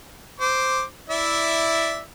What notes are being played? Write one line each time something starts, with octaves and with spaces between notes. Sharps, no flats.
C5 D6
E4 D5 E5